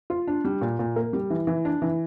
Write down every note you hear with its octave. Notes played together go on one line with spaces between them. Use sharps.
F4
D4
G3
A#2
A#2
A#3
G3
E3
E3
D4
E3